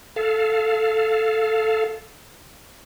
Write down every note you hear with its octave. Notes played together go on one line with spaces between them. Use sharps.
A4 F5